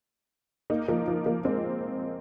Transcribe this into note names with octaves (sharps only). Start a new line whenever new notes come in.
A#3 D#4
F3 A#3
F3
F3 A#3
G#3 C4